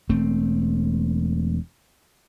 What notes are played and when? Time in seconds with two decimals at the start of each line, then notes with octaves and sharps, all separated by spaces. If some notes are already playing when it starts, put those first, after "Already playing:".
0.09 E1 A3 C4